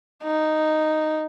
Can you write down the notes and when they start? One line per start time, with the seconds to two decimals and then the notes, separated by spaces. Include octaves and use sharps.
0.23 D#4